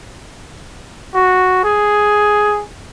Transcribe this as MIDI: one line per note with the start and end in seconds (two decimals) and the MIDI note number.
1.15 1.63 66
1.64 2.63 68